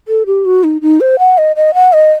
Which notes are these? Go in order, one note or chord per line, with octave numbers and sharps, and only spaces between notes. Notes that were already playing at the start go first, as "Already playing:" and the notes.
A4
G4
F#4
D#4
D#4
C5
F#5
D#5
D#5
F#5
D#5